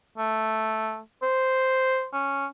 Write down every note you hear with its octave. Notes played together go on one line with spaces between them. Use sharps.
A3
C5
C#4